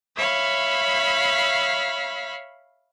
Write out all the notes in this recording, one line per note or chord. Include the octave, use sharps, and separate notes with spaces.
C#5 E5 F5 B5